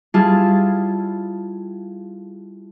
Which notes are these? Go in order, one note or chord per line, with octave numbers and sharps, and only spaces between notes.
G3 E4 F4 G#4 A5